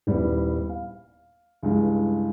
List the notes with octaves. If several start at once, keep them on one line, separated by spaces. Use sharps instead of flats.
D#1 G3 B3 E4
F5
C#2 G2 E3 G#3